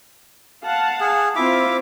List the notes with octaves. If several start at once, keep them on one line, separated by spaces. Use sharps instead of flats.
F5 F#5 A5
G#4
C4 E4 F4 E5 D6